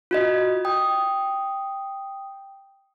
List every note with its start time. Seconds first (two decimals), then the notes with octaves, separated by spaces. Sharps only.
0.11 F4 F#4 D#5
0.65 G5 D#6